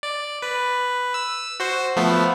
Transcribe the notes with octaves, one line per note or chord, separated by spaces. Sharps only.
D5
B4
E6
F#4 C5
F3 A3 B3